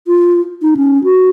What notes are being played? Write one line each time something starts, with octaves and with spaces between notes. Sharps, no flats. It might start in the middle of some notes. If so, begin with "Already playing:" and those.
F4
D#4
C#4
F#4